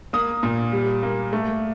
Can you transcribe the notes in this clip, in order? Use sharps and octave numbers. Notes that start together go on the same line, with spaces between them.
A#3 D#6
A#2
G3
A#3
A3